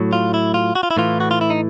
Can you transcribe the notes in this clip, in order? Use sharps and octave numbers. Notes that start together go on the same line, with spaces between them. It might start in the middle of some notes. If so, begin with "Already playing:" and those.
Already playing: A2 F#3
F4
E4
F4
F#4
F4
E4
A2 E3 F4
F#4
F4
E4
D#4